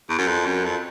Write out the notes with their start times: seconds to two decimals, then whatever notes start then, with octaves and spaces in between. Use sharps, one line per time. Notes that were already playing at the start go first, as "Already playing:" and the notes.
0.10 E2
0.19 F#2
0.28 F2
0.46 F#2
0.65 F2